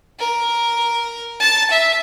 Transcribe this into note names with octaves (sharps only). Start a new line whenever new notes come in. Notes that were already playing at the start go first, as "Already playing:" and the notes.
A#4
A5
E5